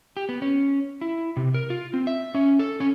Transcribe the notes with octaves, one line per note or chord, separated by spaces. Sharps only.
G4
B3
C#4
E4
C3
A#4
F4
C4
E5
C#4
A4
C#4